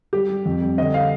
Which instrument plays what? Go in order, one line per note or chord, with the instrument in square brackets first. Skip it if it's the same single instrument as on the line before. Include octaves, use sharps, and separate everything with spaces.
[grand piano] G3 [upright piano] G4
[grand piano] G3
F2
G3
[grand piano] D3 [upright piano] D#5
[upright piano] F5